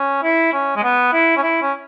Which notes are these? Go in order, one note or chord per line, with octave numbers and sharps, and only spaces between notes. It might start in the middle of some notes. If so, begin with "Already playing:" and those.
Already playing: C#4
E4
C#4
G#3
B3
E4
C#4
E4
C#4